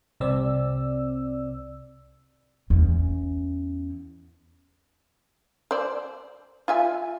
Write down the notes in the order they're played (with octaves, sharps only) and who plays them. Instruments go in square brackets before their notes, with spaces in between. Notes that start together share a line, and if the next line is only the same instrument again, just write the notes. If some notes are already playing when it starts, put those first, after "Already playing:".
[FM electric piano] C2 C3 C4 D5 E6
[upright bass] E2 C#4
[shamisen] C5 D5
F4 E5 G#5